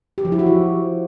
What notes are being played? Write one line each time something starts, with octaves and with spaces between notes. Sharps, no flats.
G4
F3
E4
F#4
F3